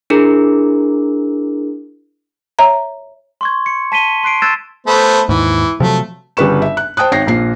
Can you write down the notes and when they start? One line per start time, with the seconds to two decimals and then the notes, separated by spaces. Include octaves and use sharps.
0.10 D4 E4 G#4 A#4
2.59 C#5 E5 A#5
3.41 C6 C#6 G#6
3.66 C#7
3.92 A5 B6 D#7 G7
4.23 C6 F#6 C7 D7
4.42 E6 F#6 G#6 A6 D7 E7
4.87 A3 B3 C5
5.29 D#2 G#2 E3
5.80 C3 F3 F#3 A3
6.37 G1 C#3 G3 B4 C#6 E7
6.62 E5
6.77 F#6
6.97 C5 G5 A5 D#6 F#6
7.12 G#1 C#5 G5 A#6 C7
7.27 A#1 A#2 C7